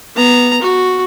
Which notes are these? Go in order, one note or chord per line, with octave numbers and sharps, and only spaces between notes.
B3 A#5
F#4